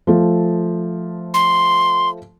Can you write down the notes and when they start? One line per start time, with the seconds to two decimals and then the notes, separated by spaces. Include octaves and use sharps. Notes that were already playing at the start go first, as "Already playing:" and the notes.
0.07 F3 A3
1.34 C6